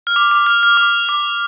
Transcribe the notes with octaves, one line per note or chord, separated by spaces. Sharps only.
F6
D6
D6
F6
F6
D6
D6